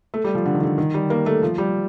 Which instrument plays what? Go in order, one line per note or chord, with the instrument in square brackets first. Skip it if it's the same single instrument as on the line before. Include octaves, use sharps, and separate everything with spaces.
[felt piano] A3
G3
F3
D3
D#3
D3
D#3
G3
A#3
A3
F3
G3